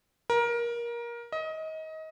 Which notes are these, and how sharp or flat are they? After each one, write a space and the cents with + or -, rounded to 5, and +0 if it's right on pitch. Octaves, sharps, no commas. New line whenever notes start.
A#4 +20
D#5 +25